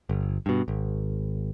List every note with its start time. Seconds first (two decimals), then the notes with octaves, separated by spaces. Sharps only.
0.09 G1
0.46 G2 B2
0.68 G#1